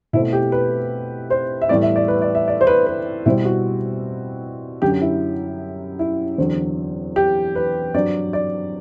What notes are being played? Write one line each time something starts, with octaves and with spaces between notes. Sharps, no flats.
B2 A3 C4 E4
G4
B4
C5
E5
A2 E3 G3 B3 D5
E5
D5
B4
D5
E5
D5
C5
B4
B4
B2 G3 C4 E4
F#4
F#2 D3 F#3 G4
E4
E4
E2 D3 F#3 C4
G4
B4
G2 F#3 C4 D5
D5